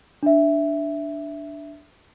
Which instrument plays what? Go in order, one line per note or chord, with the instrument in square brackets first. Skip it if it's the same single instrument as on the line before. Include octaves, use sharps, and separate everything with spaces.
[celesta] D4 E5